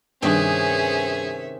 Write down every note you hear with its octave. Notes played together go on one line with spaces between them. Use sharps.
G2 C3 D#3 C#4 G#4 E5